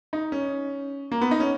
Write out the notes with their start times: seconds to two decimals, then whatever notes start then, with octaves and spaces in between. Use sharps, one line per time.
0.13 D#4
0.32 C#4
1.12 A#3
1.21 B3
1.31 D#4
1.40 C#4